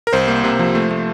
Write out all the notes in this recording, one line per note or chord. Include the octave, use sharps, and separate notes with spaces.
A#4
C2 C5
A#3
C3
F3
A3
A3